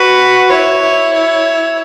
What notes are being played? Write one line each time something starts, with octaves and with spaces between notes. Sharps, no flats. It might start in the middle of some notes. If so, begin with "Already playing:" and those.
Already playing: F#4 B4
E4 C#5
E4
C#5